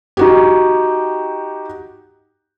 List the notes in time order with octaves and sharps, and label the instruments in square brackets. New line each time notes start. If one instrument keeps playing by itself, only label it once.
[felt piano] D#4 F#4 G4